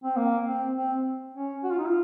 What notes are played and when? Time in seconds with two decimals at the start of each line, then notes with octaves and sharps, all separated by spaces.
0.04 C4
0.17 A#3
0.46 C4
0.76 C4
1.35 C#4
1.64 F#4
1.71 F4
1.79 D#4
1.87 F4